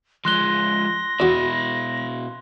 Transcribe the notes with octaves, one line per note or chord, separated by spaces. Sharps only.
F3 G#3 C6 F#6 A#6 G7
E2 B2 E4 F#4